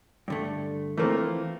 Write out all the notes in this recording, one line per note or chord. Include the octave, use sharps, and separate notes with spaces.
G2 D3 A3
E3 F3 A3 A#3 C4